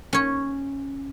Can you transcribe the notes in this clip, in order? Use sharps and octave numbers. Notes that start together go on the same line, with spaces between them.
C#4 C#5